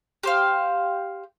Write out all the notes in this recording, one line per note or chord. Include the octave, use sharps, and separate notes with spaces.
G4 C5 F5